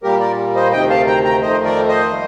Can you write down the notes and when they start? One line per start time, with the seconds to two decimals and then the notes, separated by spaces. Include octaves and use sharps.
0.03 A#2 G3 A#3 G4 A#4
0.20 A#4 D5
0.56 C5 D#5
0.72 D2 C3 D#3 D#5 G5
0.90 F5 A5
1.07 G5 A#5
1.25 G5 A#5
1.41 F2 D#3 A3 C5 D#5
1.64 A#4 D5
1.88 C5 D#5
2.11 G3 A#3